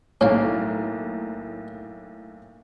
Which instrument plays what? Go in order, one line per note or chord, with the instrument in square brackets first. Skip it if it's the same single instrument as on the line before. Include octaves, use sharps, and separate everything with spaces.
[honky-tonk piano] B1 A2 [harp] A#3 [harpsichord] C#4 F5